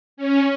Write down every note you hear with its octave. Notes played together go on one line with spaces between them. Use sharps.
C#4